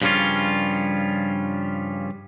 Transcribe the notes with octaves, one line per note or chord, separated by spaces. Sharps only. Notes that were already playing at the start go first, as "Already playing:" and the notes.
G2 C#3 F3 G3 C#4 F4